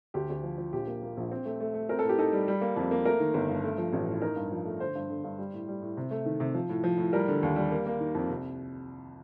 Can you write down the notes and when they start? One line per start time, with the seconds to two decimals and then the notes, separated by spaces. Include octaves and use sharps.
0.14 D2 G4
0.30 D2
0.43 F3
0.58 F3
0.73 A#1 G4
0.87 A#3
1.02 A#3
1.17 A#1
1.32 C4
1.45 A3
1.60 A3
1.74 A3
1.89 C4 A#4
1.99 A4
2.04 A2
2.09 G4
2.18 D#4 A4
2.33 G3
2.48 G3
2.61 A#3
2.76 F2
2.91 A#3
3.05 A3 A#4
3.20 D#3
3.34 G1
3.49 G2
3.64 A3
3.78 F3
3.93 A1
4.08 A2
4.22 D#4 A#4
4.36 G2
4.51 F3
4.65 A3
4.80 D3 C5
4.95 G2
5.09 D3
5.24 G2
5.38 G3
5.53 A2
5.68 G3
5.82 A2
5.97 C3
6.11 A3
6.26 D#3
6.40 C3
6.54 F3
6.69 A2
6.84 F3
6.98 A2
7.13 G3 A#4
7.28 D3
7.43 D#2
7.56 G3
7.72 A#3
7.86 A#3
8.00 D#3
8.15 F2
8.29 C2